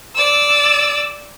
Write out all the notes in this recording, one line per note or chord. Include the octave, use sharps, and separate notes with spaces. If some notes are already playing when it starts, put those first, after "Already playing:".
D5 E6